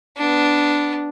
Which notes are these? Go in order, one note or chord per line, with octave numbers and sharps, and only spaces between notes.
B3 D4